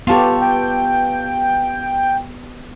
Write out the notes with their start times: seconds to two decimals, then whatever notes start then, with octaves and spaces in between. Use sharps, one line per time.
0.07 B3 F4 G4 A4 C#5
0.41 G5